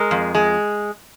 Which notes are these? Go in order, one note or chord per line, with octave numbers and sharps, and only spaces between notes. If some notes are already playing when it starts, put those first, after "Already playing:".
Already playing: G#3 A#4
F2
G#3